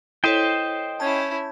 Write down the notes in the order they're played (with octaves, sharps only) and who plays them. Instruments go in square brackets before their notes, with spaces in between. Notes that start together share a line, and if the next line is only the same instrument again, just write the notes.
[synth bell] E4 A4 C#5 [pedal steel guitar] C5 D#5 G5
[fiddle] C#4 E4 [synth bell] A5 G6 G#6